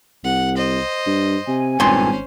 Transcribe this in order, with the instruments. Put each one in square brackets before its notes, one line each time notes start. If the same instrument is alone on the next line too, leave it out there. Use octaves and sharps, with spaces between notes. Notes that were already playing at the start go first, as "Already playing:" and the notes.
[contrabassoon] C2 [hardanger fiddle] F#5
[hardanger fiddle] C5 D#5
[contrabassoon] G2
[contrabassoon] C3 [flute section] G#5
[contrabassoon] G#1 [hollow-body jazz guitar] G2 A#2 C6 [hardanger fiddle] C#4 C5